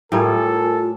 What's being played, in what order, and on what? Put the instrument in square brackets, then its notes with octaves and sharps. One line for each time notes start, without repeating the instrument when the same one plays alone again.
[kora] A2 G3 [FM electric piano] E4 A#4 G#5 [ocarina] F4 [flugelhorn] A4